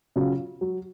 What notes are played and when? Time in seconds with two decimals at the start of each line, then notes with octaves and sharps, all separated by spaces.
0.16 C#3 F#3 C#4 F4
0.61 F#3